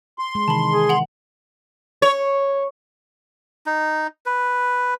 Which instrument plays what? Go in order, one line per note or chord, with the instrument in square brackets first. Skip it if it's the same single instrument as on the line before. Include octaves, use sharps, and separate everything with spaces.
[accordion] C6
[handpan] G#3
[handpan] C3 D#3 E3 [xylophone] A5 B5
[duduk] G#4
[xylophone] F#5 F7 F#7
[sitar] C#5
[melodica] D#4
B4